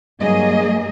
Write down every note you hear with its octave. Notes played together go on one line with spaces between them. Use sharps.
G2 F#3 A#3 G#4 D#5